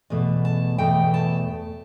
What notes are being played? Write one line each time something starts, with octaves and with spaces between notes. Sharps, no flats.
E2 B2 A3
A5
E2 B2 A3 G5
A5